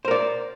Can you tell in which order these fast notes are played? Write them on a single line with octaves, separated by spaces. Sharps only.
C5 A#4 D5